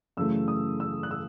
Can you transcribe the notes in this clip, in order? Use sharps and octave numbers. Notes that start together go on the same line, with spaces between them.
F#2 C#3 E3 A3 E6
D#6
E6
F#6
E6